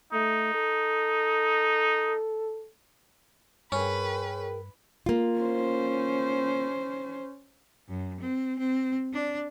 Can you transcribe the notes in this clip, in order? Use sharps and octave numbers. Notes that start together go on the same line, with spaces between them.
A3 D#4
A4
G2 C#4 G#4 A#4 B4 G5
A#3 F4
C#4 C5
F#2
C4
C4
D4